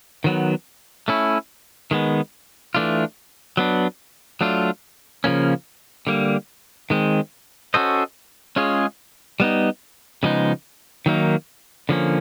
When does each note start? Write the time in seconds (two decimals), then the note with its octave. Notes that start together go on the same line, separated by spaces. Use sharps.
0.24 D#3 F#3 B3
1.08 A3 C#4 E4
1.91 D#3 G#3 B3
2.75 E3 A3 D4 F4
3.57 F#3 B3 D4
4.41 F#3 A3 D4 F4
5.24 C#3 F3 A#3 C#4
6.07 D3 G3 A#3
6.90 D#3 G#3 C4
7.74 C#4 F#4 A4 C5 D#5
8.56 G#3 C#4 F4 G#4 C#5
9.40 G3 B3 D#4
10.23 C#3 F3 G#3 B3 D#4
11.06 D#3 F#3 A#3 D#4
11.89 D3 F3 A#3 C#4